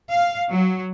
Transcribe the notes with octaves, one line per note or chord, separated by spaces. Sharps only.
F5
F#3